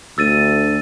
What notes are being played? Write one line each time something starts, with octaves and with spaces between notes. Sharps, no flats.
D2 E6 A6 D#7